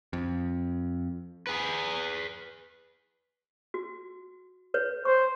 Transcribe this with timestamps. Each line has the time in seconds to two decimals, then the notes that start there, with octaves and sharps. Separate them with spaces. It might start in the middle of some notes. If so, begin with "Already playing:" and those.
0.13 F2
1.47 G#4 B4
3.74 F#4
4.74 B4 C#5
5.05 C5 C#6